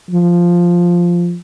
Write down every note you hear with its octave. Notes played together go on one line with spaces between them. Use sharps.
F3